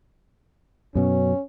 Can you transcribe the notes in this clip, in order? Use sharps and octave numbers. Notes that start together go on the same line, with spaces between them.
F#2 B2 F#3 C#4